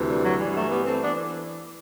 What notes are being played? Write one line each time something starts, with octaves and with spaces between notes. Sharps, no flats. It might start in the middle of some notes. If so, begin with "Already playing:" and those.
Already playing: D2 C3 E3
G3
F#3
G2 E3 G3
F#3 A3
G3 B3
A3 C4
E3 B3 D4